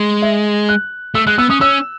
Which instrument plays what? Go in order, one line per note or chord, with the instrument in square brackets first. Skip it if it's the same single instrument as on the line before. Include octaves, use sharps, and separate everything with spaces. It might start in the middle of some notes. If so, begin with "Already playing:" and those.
Already playing: [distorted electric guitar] G#3
[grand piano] E5
F#6
[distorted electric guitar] A3 [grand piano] E6
[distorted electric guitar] G#3 [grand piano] F#6
[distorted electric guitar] B3 [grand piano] E6
[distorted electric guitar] C#4 [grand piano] D#6
[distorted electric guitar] C#4 [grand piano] E6